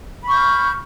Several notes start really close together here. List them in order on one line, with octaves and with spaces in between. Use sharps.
B5 C#6 G6 F6